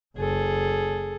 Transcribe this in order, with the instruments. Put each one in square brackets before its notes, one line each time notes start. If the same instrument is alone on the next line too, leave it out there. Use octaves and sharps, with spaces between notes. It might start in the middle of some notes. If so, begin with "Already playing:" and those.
[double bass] F#1 [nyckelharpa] G#4 A4